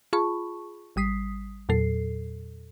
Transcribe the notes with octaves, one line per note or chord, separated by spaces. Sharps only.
F4 G#4 A5 B5 C#6
G#1 G3 D#6 B6 C7
E2 A#2 F#3 A4 C7